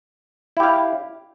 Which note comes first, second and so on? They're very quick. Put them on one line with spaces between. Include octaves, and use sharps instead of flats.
E4 G4 F5